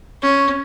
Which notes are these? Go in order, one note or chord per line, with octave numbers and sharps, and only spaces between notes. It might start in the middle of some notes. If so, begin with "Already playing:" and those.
C#4